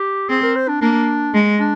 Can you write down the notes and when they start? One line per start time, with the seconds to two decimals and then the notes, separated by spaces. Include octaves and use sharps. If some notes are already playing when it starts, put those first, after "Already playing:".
Already playing: G4
0.29 C4 G#4
0.42 A#4
0.56 C5
0.68 D4
0.81 A#3 D4
1.34 G#3
1.60 D4